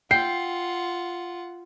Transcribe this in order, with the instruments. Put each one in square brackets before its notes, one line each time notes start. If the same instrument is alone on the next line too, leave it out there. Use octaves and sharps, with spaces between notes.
[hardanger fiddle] F4 F#5 [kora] G5 [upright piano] C7